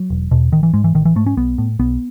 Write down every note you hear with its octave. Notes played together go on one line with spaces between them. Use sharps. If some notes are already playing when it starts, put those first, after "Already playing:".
Already playing: F#3
E1
E2 B2
A1 D#3
E3
G#2 G#3
E3
A1 D#3
E3
G#2 A3
C#4
B1 B3
A2
B1 B3